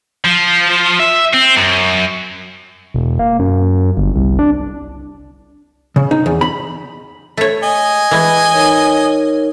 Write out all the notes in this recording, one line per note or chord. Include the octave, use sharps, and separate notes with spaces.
F3
E5
C4
F#2
E1
A#3
F#2
G1
C2
D4
C#3
D#4
E2
B5
A3 C#5
D#5 G#5
E3 G#3 B4
D#4 A#4 C#5